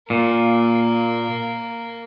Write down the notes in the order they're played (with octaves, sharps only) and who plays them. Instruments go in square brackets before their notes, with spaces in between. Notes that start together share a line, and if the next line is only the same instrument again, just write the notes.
[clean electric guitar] A#2 [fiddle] A#3